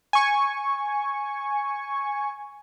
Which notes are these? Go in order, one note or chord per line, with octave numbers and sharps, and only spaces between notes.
G#5 C#6